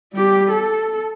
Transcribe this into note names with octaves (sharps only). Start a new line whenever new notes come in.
G3 G4
A4